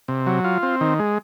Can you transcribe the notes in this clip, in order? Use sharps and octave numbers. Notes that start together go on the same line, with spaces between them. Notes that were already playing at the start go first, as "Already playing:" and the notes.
C3
F#3
F4
C4
D#3
G#3